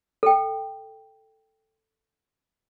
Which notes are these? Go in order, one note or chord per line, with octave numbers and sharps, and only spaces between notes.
A4 G5